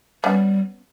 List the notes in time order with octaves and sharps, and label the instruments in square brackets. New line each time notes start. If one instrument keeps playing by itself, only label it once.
[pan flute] G3 [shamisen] B3 C#4